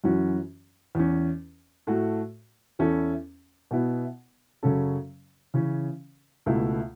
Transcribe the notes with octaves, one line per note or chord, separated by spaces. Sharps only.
F#2 E3 C#4 F#4
E2 E3 C#4
A2 A3 F#4
E2 E3 C#4 E4 A4
B2 B3 E4
F#2 C#3 F#3 C#4 A4
C#3 E3 C#4
C#2 B2 A3 E4